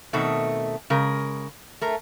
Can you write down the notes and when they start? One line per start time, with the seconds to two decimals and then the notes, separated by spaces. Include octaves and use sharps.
0.13 B2 D#3 A3 C4
0.90 C#3 G#3 A#4
1.81 A3 A#4